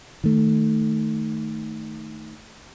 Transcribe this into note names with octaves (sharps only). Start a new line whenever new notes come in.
D#3 A3